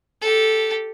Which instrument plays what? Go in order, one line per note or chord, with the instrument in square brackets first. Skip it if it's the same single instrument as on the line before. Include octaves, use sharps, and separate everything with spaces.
[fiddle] G4 A4